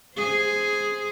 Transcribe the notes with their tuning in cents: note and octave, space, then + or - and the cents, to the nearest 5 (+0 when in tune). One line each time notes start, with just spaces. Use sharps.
G#4 +0 C5 +0